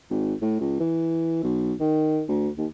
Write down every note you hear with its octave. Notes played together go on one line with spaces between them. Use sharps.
G#1
A2
C#2
E3
B1
D#3
D2
D#2